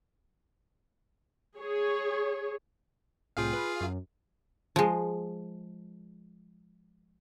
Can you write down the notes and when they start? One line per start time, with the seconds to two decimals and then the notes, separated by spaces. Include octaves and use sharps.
1.57 G#4 C#5
3.37 C2 A2 F4 G#4 F5 G5
3.53 B4
3.81 F#2
4.76 F3 G#3